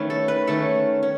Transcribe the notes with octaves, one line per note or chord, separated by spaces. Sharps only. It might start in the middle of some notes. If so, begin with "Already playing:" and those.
Already playing: D#3 A3 C#4 B4
A4
B4
D#3 A3 C#4 A4
C#4